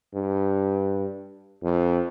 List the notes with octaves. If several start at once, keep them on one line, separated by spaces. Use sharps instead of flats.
G2
F2